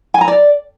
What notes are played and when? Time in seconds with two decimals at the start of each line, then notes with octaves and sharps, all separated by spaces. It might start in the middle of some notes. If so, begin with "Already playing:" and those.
0.14 G#5
0.21 A#5
0.28 D5